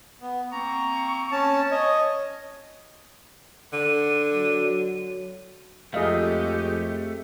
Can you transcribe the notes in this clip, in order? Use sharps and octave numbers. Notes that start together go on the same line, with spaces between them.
B3
A#3 C4 A#5 C#6
C#4 A5
C#5 D#5
D3 D#7
F#3
F2 G#3 A3 G4 G#4 D#5 F5